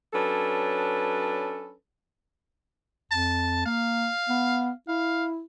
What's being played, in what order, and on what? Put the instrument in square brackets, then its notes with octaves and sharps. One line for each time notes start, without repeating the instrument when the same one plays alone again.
[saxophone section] F#3 C#4 D4 A4 B4
[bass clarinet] F2 [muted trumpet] A5
[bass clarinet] A#3 [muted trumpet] F5
[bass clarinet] B3
[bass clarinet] E4 [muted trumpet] F5